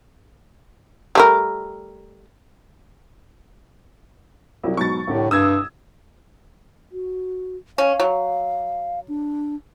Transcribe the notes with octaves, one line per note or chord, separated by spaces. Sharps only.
G3 A3 A#4
C2 F#3 E4
G#2 B2 F#3 C#6 A6
C2 A2 D3 G4
G2 D#6 E6 G#6
F#4
C#4 F5
F#3
D4